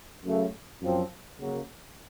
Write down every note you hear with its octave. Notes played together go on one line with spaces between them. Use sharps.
F#2 C#3 A3
F#2 F3 C4
C#3 F#3 A#3